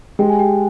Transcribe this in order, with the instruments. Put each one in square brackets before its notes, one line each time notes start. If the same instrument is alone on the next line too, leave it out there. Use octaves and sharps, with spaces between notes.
[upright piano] G#3 [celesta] G4 G5
[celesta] G#5
G4 G5